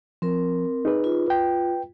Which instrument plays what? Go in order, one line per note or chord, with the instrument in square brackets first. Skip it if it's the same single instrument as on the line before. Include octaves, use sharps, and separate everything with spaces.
[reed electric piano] F3 [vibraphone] C4 A#4
[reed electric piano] D#4 G#4 B4
[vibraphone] F4
[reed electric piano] B4 G5